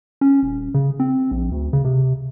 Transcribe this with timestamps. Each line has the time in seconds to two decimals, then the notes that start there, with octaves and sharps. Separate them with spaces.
0.21 C#4
0.43 D#1
0.74 C#3
1.00 C4
1.31 A#1
1.52 D2
1.73 C#3
1.85 C3